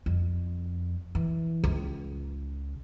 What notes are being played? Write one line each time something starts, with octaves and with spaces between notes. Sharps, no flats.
F2
E3
C#2